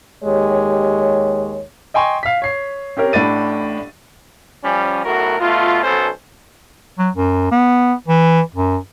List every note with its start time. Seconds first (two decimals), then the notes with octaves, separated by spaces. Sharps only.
0.24 D#2 G#3 G4 C#5
1.94 D#5 G5 G#5 C6 C#6
2.23 F5 B6
2.42 C#5 C7
2.97 C4 C#4 G4 A#4
3.13 A1 A2 D4 B5 A6 D#7
4.63 F3 G3 C#4
5.04 B1 A2 A3 F#4 A#4
5.39 B2 A3 F4
5.83 B1 B2 C#4 A4 C5
6.99 F#3
7.16 F#2
7.51 B3
8.08 E3
8.54 F#2